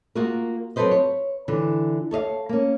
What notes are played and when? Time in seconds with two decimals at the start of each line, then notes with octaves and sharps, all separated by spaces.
0.15 A#3 F4 F#4 G#4 A#4
0.76 F#3 C4 A4 B4 C5 D#5
0.91 C#5
1.48 D3 E3
2.11 A4 C#5 D#5 F5
2.49 A#3 C#4